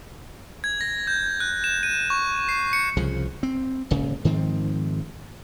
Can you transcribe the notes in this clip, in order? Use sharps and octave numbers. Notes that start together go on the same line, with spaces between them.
G#6
A#6
G6
F#6
E7
D#7
C#6
C7
C#7
C2 C#3 F3
C4
D#1 G#1 C#3
G#2 D#3 F3 C4